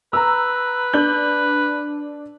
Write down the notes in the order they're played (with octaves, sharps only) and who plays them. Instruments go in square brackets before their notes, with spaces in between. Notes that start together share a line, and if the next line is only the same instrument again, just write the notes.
[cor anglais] B4 [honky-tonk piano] A#5 E6
[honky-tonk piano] D4 G6 F#7